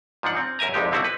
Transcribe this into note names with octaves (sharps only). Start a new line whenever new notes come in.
G#2 F3 D4 F#5
C4
F#2 A#4 E5 G#5 A#5
C2 F2 C3 G#3 D#4 G4
B2 D3 C4 E4 F#4
B4